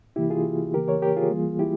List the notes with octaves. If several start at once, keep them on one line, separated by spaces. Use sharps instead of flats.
C3 E3 A#3 E4 G4
F4 G#4
C#3 E3 A#3 G4 A#4
A#4 C#5
G4 A#4
F4 G#4
E3 G3 A#3
E4 G4